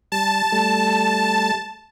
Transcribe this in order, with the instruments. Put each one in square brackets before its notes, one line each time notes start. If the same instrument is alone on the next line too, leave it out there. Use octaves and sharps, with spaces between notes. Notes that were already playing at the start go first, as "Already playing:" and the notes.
[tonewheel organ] G3 [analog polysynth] A5
[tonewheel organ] G3 A3